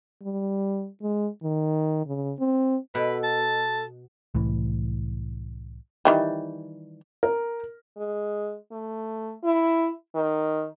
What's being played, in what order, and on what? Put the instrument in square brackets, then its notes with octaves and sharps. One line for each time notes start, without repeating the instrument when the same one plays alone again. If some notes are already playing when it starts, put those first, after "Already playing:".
[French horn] G3
G#3
D#3
C#3
C4
[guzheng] B2 [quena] A4 [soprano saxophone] B4
[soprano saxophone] A5
[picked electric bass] C2 A2 E3
[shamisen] D#3 E3 G3
[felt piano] A#4
[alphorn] G#3
A3
E4
D#3